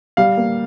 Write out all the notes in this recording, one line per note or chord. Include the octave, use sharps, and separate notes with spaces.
G3 F5
A#3